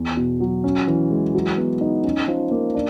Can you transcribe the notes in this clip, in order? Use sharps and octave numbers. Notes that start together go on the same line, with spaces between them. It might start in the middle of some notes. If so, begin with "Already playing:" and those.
Already playing: E2
B2
F#3
C#4
E3
G#3
F#3
B3
D#4
C#4
F3
A#3
D4